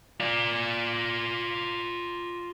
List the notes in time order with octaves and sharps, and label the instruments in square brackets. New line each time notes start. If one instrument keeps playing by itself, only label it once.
[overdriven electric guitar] F4 D5